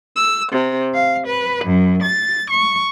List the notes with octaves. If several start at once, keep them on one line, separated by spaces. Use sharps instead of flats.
E6
C3
F5
B4
F#2
A6
C#6